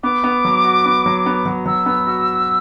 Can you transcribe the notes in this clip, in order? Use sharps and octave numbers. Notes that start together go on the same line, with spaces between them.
B3 D6
B3
F#3
F#4
B3
F#3
B3
F#3
F#3 E6
B3
F#4